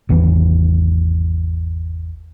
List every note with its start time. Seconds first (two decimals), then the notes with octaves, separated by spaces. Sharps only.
0.09 G#1 E2 E3